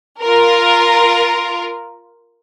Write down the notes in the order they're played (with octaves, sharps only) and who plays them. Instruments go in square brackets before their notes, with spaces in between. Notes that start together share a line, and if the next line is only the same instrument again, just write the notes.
[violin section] F4 A#4